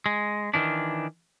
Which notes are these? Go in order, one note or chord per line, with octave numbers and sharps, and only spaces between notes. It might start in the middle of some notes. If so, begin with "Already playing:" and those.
G#3
D#3 E3 D4